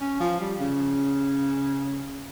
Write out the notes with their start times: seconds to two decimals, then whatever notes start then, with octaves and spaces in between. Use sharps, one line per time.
0.01 C#4
0.20 F3
0.40 G3
0.59 C#3